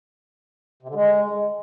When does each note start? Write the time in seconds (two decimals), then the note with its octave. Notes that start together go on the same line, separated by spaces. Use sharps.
0.83 C3
0.89 D3
0.95 G#3